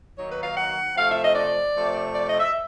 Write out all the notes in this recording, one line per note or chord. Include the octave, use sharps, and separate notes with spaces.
D#3 F#3 A#3 D#4 C#5
B4
F5
F#5
C3 F3 A3 F5
E5
D#5
D5
C3 F3 A3
D5
D#5
E5